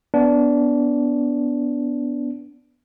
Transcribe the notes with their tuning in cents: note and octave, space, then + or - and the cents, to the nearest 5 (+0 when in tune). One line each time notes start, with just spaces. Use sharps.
B3 +0 D4 -15